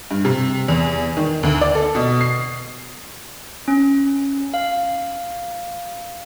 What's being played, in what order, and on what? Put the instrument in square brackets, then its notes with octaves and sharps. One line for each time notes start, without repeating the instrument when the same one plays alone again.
[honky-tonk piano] G2
C3
E2
D#3
D2
D5
A4
B2
C7
[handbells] C#4
F5